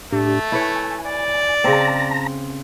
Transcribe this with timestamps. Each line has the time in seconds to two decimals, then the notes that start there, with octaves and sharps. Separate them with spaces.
0.12 A2 A3 D4 G4
0.52 E4 B4 C#5 G#5
1.06 D5
1.64 C#3 C4 A5 A#5 A#6